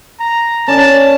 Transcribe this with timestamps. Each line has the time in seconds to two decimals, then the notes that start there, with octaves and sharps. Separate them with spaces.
0.20 A#5
0.68 C#4 D5 A5